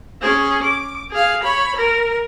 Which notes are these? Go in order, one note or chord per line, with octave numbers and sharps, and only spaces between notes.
C#4 G#4
D6
G#4 F5
C#5 B5
A#4